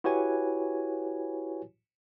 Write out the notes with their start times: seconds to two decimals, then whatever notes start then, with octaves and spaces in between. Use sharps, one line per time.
0.04 E4 F#4 G4 B4 C#5 G#5